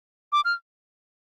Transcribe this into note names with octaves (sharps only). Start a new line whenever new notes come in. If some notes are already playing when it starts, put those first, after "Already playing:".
D6
F6